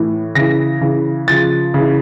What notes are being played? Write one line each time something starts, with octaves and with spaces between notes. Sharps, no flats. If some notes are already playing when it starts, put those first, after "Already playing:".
Already playing: A2 E3
C#3 E3 A#6
C#3 E3
C#3 F3 A6
C#3 E3